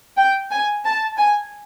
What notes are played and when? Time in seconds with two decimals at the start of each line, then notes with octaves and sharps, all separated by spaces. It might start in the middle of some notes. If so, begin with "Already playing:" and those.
0.17 G5
0.51 G#5
0.85 A5
1.17 G#5